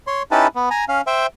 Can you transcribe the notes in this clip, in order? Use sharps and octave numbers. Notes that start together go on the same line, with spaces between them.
C#5 C6
C#4 D#4 E4 G4 B4 A5
B3
G#5 A#5
C#4 F5
C5 E5 G5